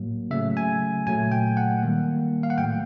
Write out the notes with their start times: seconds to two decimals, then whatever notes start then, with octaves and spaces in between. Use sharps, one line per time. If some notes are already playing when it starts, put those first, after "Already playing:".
Already playing: A2 F#3 A#3
0.31 C#3 F#3 A3 E5
0.57 G#5
1.07 A#2 F#3 A3 G#5
1.32 G5
1.57 F#5
1.83 D#3 G3 A#3
2.43 F5
2.50 F#5
2.58 A2 F#3 A3 G5